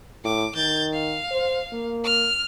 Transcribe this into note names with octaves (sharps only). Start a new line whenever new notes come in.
A2 D6
D#3 G6 A6
F5
C5
A#3
F6